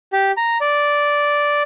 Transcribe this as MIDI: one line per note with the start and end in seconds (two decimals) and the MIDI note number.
0.13 0.31 67
0.37 0.58 82
0.61 1.63 74